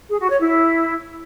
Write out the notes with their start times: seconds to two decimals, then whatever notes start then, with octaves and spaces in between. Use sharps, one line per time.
0.10 G#4
0.20 F#4
0.30 C#5
0.40 E4